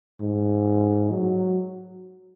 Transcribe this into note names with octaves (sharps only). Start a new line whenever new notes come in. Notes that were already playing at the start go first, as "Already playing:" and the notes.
G#2
F#3